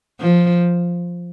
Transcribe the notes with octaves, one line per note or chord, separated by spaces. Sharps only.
F3